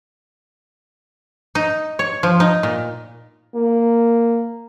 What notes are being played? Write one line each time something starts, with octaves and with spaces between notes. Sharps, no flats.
D#4
C#5
F3
D#4
A#2
A#3